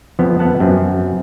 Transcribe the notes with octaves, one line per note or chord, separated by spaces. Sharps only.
F2 F3 B3
A#3 B3 F#5 A5
F#2 C4